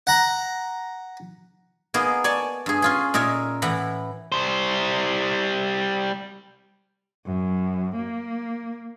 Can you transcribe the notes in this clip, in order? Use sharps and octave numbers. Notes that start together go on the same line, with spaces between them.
F#5 A#5
A#3 B3 D#4 G#4
C#5 D5 G#5 A5
G2 G#4
C#4 F4 G#4
A#2 D#4 A#4 C#5 E5
A2 E3 E4 F#5 A#5
G3 C5
F#2
A#3